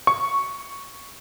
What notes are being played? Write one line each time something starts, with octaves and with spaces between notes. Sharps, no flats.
C#6